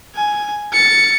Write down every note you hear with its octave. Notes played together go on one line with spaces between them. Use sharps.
G#5
A6 C#7